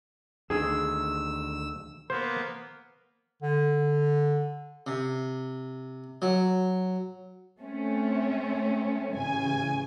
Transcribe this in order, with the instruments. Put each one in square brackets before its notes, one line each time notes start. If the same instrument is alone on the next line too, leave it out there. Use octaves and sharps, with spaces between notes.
[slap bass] D2 D#3 [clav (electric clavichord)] G#4 [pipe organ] E6
[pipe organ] A#3 B3 [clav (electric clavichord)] C5
[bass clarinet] D3
[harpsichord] C3
F#3
[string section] A3 C4 C#4
A1 C#3 G#5